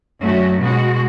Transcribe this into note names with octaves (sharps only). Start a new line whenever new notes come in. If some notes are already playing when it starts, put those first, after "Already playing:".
F#2 A3 C#4 F#4
B2 G#3 F#4